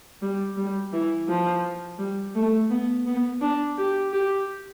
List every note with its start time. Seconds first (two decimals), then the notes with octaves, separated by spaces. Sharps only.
0.22 G3
0.57 G3
0.93 E3
1.28 F3
1.98 G3
2.35 A3
2.70 B3
3.06 B3
3.41 D4
3.78 G4
4.13 G4